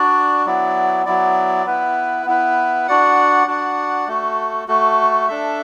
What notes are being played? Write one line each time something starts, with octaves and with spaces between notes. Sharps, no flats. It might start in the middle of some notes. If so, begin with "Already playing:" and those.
Already playing: D4 F#4 D5
F#3 B3 E4 D5
F#3 B3 E4 D5
B3 E4 B4
B3 E4 B4
D4 F#4 D5 F#5
D4 F#4 D5 F#5
A3 F#4 A4
A3 F#4 A4
D4 A4 E5